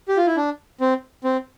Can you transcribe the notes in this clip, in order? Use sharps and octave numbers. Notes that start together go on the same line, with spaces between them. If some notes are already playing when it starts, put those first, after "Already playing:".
G4
F4
E4
D4
C4
C4